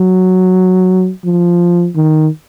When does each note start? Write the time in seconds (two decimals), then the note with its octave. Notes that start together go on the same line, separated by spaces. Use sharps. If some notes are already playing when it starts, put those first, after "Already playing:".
Already playing: F#3
1.25 F3
1.96 D#3